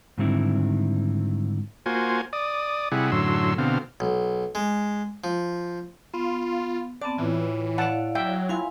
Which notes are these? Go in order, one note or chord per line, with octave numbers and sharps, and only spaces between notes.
G#2 D3 D#3 G3 C4 E4
A#3 F4 F#4 C5 G#5
D5 D#6
C3 G3 E4 G#4 F#5
F#2 A2 D3 F#3 C6 E6
B2 D3 C4 F5
B1
G#3
F3
B3 F4
B3 C4 D5 A5
A2 E3 F4
E4 D5 F5 F#5 A5
F#3 E5 G5
E4 F4 F5 G#5 C6